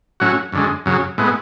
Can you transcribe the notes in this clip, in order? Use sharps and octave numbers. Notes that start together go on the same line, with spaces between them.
A2 F#3 C#4 F#4
F#2 D3 G#3
F#2 C#3 F#3
A2 G#3 B3